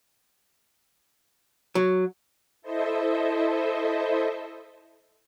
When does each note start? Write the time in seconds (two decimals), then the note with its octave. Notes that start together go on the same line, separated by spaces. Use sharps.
1.75 F#3
2.62 E4 A4 C5 D#5 E5